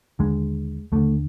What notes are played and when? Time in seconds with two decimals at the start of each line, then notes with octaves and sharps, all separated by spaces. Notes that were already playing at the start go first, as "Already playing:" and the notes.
0.19 D#2 D3 G#3
0.92 D#2 D3 A3